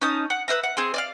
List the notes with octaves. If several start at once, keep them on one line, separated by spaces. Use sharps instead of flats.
C#4 D#4 A5 D#6
F#5
B4 C5 E5 A#5
F#5
C4 G#4 C6
D5 D#5 F5